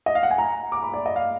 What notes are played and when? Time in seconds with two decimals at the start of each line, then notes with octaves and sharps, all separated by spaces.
0.06 D#5
0.15 F5
0.23 F#5
0.31 G#5
0.38 A#5
0.72 D6
0.83 B5
0.94 D5
1.06 D#5
1.16 F5